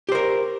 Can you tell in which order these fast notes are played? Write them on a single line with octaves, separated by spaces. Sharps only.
G4 C5 A#4